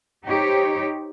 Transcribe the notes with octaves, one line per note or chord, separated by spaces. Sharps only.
D#4 G4 C5 C#5